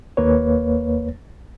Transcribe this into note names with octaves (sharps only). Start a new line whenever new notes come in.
D#2 A#3 B4 C#5